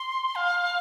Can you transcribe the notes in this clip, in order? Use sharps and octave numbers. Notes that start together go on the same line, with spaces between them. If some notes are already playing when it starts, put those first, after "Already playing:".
Already playing: C6
F5